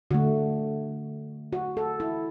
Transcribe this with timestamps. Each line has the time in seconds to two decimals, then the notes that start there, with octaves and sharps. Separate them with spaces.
0.11 D3 A3 F#4
1.53 F#4
1.77 A4
2.00 E4